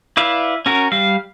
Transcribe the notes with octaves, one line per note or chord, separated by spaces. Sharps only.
E4 B4 D5 E5 F5
C#4 F#4 A#4
G3 F5